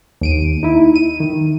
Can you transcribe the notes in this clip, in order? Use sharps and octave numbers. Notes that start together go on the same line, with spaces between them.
D#2 D7 D#7
D#4 E4
D#7
D#3